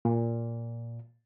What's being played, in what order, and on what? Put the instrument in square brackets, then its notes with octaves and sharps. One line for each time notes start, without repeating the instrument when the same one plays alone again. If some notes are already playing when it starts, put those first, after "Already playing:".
[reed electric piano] A#2